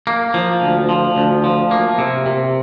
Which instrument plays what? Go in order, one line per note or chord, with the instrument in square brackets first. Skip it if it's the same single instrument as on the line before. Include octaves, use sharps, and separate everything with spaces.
[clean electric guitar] A#3
F3
D2
F3
D2
F3
A#3
C3
C3